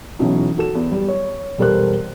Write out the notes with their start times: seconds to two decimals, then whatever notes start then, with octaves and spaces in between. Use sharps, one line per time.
0.19 B1 E3 F#3 C#4 D#4
0.58 F#4 A4 E7
0.75 E2
0.91 G3
1.08 C#5
1.58 E1 G3 A4 A#4 C5 F#6